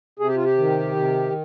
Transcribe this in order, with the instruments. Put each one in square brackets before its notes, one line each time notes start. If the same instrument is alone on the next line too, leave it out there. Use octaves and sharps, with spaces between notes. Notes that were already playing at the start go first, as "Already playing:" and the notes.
[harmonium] C3 G#4
G4
F4
G4
D#3
C3